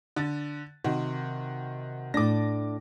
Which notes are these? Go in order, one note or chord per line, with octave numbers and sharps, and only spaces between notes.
D3 A6
C3 D#3 F#4
A2 D4 D6 A#6